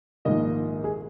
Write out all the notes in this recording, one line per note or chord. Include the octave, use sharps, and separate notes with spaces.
A#1 G#2 D#3 A#3 D#5
G#4